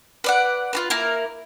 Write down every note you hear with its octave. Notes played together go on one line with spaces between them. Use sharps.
B4 D5 F#5
F4 F#4 B4
A#3 E4 A#4